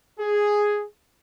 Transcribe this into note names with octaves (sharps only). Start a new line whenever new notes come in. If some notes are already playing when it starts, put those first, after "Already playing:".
G#4